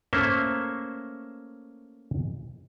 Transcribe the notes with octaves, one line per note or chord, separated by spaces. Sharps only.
A3 A#3 C#4 C5 E5